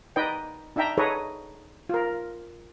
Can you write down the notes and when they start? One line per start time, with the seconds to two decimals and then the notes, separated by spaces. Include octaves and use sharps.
0.16 D#4 B4 D5 D#5 G5
0.76 D4 D#4 E5 G5 A#5
0.98 D#4 G#4 A4 B4 C#5 D#5
1.89 F4 A#4